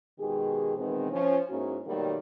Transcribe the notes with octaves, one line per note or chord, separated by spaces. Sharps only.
B2 D#3 G#3 G4 G#4
B2 D#3 E3 G#3 B3 C4
F3 C#4
G#2 A#3 C#4 D#4 E4 F#4
B2 D#3 F#3 G3 A3 A#3